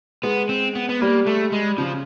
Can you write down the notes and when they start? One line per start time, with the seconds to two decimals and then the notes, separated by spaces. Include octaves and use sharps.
0.23 G#3 B3
0.49 C4
0.76 B3
0.89 B3
1.01 G3 A#3
1.27 A3
1.53 G#3
1.78 C#3 F3